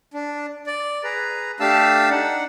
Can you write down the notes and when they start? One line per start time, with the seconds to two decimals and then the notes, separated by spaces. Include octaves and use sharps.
0.14 D4
0.66 D5
1.04 G#4 B4 A#5
1.60 A3 D4 G4 F5 A5 E6
2.10 D4 D#4 F#5